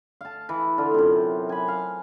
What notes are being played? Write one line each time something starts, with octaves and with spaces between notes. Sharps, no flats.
F5 A5
E3
D3 F4
F#2 C3
G#5 B5
F5